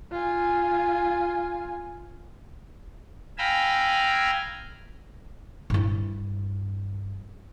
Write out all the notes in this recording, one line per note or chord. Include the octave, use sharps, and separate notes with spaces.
F4 G#5
F5 G5 G#5 A#5 B5 E6
G2 E4